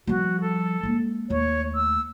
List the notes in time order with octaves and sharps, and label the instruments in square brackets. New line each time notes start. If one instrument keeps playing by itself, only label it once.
[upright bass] F3 G3 [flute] F#4
[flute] A4
[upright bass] G#3 A#3
[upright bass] D#2 A3 [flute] C#5
[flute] E6